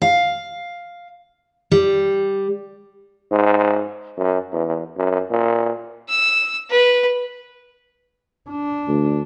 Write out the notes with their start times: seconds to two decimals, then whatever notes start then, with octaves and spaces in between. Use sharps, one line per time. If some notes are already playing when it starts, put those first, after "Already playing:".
0.02 F5
1.71 G3
3.31 G#2
4.17 F#2
4.52 E2
4.97 F#2
5.30 A#2
6.09 E6
6.71 B4
8.50 D4
8.88 D2